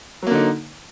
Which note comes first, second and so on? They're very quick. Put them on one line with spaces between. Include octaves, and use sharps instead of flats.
F#3 A#3 D3 D#4